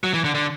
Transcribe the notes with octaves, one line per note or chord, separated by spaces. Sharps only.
F#3
E3
D3
D3